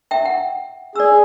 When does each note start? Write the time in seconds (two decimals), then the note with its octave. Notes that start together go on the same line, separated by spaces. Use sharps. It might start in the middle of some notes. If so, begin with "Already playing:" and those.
0.11 E5 G5
0.25 F#5
0.95 G#4 D5 E6